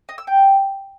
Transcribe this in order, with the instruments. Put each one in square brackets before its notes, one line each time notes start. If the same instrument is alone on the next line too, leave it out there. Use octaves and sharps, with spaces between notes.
[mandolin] D#5
E6
G5